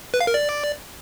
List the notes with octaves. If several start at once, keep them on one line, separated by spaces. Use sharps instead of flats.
B4
F5
A#4
D5